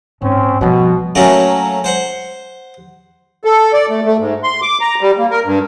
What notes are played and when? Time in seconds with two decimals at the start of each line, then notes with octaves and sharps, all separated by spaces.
0.22 G#2 C4 C#4
0.61 B2 F3 G3
1.15 F#3 A3 A#3 C#4 F#4
1.84 C5 F#5
3.44 A4
3.73 D5
3.89 A3
4.05 A3
4.19 G#2
4.43 C6
4.62 D6
4.81 A#5
5.01 G3
5.18 A#3
5.31 A#4
5.45 G2